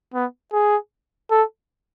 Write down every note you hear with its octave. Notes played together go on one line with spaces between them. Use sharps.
B3
G#4
A4